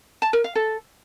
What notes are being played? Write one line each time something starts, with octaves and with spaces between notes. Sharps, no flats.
A5
A#4
F5
A4